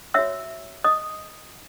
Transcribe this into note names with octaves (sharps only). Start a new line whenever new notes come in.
F#4 C#5 E5 E6
D#5 D#6